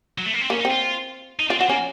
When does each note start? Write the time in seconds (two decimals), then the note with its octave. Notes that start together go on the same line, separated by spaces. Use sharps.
0.18 F#3
0.26 A3
0.33 A#3
0.41 C4
0.50 A#3 C#4
0.60 D#4
0.65 C4
0.71 F4
1.40 D#4
1.50 C4 F4
1.60 C4 F#4
1.69 A#3 C#4